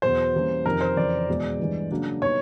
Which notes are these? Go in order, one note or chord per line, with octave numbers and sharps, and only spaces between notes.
E2 B2 F#3 C5
E3 G3 A#3 C#4
F2 C3 D#3 A#4
C5
F2 C#3 E3 D5
E2 B2 G#3 B3
G2 E3 G#3
C#3 F#3 A#3 D4
B2 G3 B3 D#4 C#5